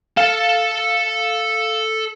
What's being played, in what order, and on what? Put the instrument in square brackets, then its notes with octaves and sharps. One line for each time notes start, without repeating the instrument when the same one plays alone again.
[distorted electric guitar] A4 A5 [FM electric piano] F5